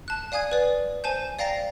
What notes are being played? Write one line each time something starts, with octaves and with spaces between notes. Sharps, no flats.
A5 F#6
D5 F5 G#5 D#6 G#6
B4 D5
C5 G#5 A5 G6
D5 F5 G5 A#5 A#6 C7